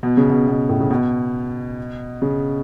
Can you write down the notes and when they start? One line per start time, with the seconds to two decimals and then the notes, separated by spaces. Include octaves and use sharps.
0.03 B2
0.17 C#3
0.30 B2
0.48 B2
0.69 A2
0.80 C#3
0.91 B2
2.22 C#3